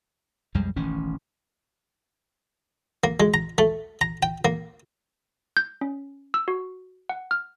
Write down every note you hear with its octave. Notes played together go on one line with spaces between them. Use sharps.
B1 F2 G3 G#3
E1 A1 D#3 C#4
A#3
G#3
A#5
A3
A#5
G5
A#3
G6
C#4
E6
F#4
F#5
F6